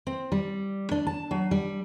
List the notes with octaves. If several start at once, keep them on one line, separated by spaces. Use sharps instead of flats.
C4
G3
D4
A5
F#3
G3